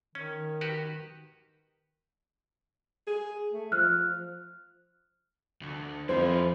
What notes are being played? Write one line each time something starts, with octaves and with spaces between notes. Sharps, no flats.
D#3 C#4
F#4 G4 B4
G#4
A3
F3 F6 F#6
D2
F2 F3 E4 C5